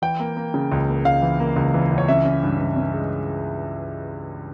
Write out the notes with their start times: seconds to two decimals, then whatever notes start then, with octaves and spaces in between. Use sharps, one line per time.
0.02 E3 G5
0.20 A#3
0.37 A#3
0.54 C#3
0.72 C#2
0.89 A#3
1.05 C#2 F5
1.22 E3
1.40 A#3
1.56 C#2
1.74 E3
1.91 C#2
1.98 C#5
2.08 C#4 E5
2.25 C#4
2.43 G2
2.60 G2
2.76 C#4
2.94 G#3